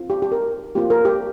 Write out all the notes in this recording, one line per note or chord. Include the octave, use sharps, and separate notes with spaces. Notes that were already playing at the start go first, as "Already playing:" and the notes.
Already playing: C4 F4
G4
G4
A#4
A#3 F4 G4
A#4
G4